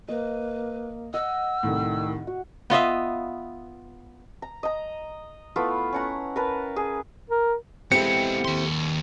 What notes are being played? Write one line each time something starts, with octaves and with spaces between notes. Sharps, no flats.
A#3 B4 D#5
D#5 F#5 E6
C2 A2 D#3
F#4
B3 F4 D#5 E5
A#5
D#5 A#5
A3 B3 E4 F4
C#4 F#5 A#5
A#4 B4 A5
G#4
A#4
G#3 B3 C4 E4 G4 A4 C#7
D#2 C6